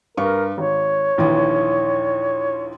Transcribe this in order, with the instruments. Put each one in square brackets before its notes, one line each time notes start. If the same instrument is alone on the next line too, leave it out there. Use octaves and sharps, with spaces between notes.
[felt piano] G2 C#6 [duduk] A#4
[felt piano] G#1 [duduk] C#5
[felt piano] A#1 D#2 E3